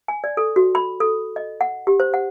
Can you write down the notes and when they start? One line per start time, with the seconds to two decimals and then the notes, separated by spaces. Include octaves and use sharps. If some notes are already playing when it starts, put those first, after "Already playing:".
0.08 G#5
0.24 D5
0.37 A4
0.56 F#4
0.75 B5
1.00 A4
1.36 D#5
1.61 F#5
1.87 G4
2.00 C5
2.14 F#5